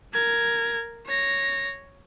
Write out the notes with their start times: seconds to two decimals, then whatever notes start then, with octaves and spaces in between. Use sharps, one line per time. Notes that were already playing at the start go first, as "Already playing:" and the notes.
0.14 A#4 G#6
1.06 C#5 A#6